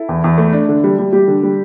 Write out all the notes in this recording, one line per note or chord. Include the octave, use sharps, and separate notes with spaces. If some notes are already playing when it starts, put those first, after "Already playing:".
Already playing: E4 A4
E2
E2
A3
D4
D3
G3
G3
G3 G4
D3
G3